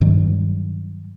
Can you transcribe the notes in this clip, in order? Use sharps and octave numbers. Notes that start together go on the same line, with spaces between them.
G2 D#3 F#3 G3